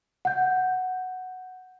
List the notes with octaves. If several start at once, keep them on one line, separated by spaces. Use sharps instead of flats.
F#5 G6